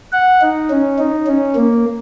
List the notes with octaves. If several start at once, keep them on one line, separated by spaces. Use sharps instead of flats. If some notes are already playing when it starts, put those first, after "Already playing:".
F#5
D#4
C#4
D#4
C#4
A#3